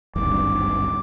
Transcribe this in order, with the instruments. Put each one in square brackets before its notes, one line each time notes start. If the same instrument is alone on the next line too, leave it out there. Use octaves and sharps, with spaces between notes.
[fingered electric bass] D1 G#1 G2 [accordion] D6